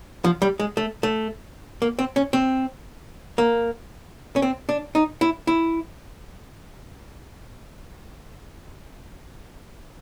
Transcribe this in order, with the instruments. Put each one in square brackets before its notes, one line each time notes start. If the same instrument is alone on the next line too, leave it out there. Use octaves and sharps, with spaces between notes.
[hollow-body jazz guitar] F3
G3
G#3
A3
A3
A#3
C4
C#4
C4
A#3
C#4
C4
D4
D#4
E4
E4